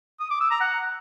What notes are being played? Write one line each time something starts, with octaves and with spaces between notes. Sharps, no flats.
D#6
D6
E6
A#5
F#5